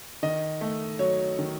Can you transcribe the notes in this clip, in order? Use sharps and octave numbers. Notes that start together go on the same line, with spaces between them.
D#3 D#5
A3
F#3 C#5
D#3